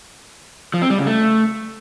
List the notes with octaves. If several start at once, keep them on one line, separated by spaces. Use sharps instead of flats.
F3
C4
G3
C#3
A3